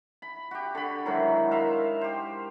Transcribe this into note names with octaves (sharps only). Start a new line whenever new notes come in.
B5
F#4 G4
D3 B5
G#2 D#3 F#3 E4
A#4 E5 F5 C6
G4 C5